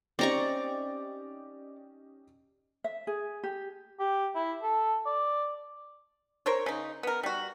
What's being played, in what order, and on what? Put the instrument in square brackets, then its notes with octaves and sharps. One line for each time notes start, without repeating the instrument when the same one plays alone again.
[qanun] C4 A#5 C#6 [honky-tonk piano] C#4 D#4 G4 [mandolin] D5
[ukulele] E5
G#4
G4
[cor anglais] G4
E4
A4
D5
[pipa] A#4 C5 C#5
C#3 D#4
B3 A#4
G3 F#4